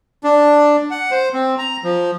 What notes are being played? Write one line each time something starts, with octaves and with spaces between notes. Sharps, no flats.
D4
F#5
C5
C4
A#5
F3